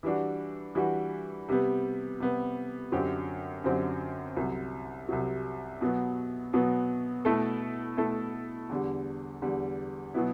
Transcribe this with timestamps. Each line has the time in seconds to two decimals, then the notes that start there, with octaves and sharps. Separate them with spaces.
0.03 E3 G3 D4 F#4
0.75 E3 G3 D4 F#4
1.48 C3 G3 B3
2.20 C3 G3 B3
2.92 F#2 D3 F#3 C4 G4
3.64 F#2 D3 F#3 C4 G4
4.36 C2 C3 F#3
5.09 C2 C3 F#3
5.81 B2 F#3 B3
6.53 B2 F#3 B3
7.25 B2 A3 E4 A4
7.97 B2 A3 E4 A4
8.69 E2 D3 G3
9.42 E2 D3 G3
10.14 B2 F#3 B3 E4